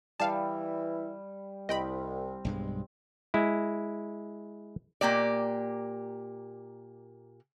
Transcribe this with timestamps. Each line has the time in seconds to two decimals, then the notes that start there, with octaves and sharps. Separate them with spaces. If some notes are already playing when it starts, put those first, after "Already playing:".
0.20 E3 G3 E4 F5 A5
1.69 C2 C4 D#5 G5 B5
2.45 B1 G2 G#3
3.34 G#3 E4
5.01 A#2 A#3 G4 D5